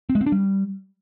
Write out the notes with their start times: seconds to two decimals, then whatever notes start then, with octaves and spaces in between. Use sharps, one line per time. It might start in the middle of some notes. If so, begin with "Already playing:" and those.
0.10 C4
0.15 G#3
0.21 C4
0.26 D4
0.32 G3